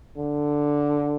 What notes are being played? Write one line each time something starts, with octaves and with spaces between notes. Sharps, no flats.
D3